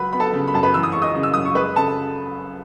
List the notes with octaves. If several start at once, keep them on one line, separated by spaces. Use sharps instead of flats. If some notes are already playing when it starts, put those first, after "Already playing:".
Already playing: C#2 F#3 B4 B5
B3 B5
A4 A5
C#3
B5
F#2 A5
B4 B5
E3 E6
D#6
G#3 C#6
D#5 D#6
C#3
E6
F#2 D#6
C#6
G#3 B4 B5
C#3 A4 A5